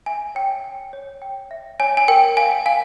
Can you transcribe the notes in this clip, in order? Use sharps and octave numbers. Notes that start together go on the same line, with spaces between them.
E5 G#5
C#5 G5
G5
C#5
G5
E5
C#5 G#5
G#5
A#4 G5
F5 G#5
F5 G#5